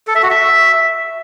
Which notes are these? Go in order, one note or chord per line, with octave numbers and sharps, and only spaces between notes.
A4
E5
F#4
E5